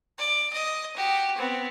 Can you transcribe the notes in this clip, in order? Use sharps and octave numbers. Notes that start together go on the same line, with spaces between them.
D5
D#5
F#4 G4
B3 C4